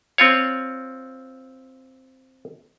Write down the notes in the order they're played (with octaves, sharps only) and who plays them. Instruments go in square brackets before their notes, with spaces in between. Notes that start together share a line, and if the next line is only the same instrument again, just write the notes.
[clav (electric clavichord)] C4 F4 C#5